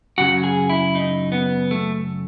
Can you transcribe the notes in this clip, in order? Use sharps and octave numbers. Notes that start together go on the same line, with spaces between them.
F#2 C#3 F#3 F#4
G#4
E4
D#4
B3
A3